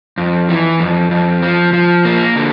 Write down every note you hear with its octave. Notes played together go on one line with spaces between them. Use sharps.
F2
E3
F2
F2
F3
F3
A#3
D3